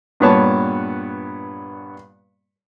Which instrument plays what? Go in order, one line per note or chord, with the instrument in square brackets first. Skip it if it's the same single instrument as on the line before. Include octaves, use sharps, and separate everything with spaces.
[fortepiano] G2 A#2 B3 C#5 A5